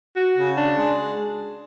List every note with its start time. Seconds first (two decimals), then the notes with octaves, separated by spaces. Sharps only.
0.14 F#4
0.35 C#3
0.56 D4
0.76 G#3